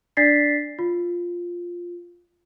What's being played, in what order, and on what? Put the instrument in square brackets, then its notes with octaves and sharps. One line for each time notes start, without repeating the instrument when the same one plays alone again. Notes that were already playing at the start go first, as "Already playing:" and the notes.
[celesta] D4 D5 A6 B6 C7
F4